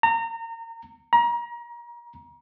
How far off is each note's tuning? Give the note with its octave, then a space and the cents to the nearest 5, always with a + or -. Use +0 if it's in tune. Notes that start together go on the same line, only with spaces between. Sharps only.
A#5 -30
A#5 +30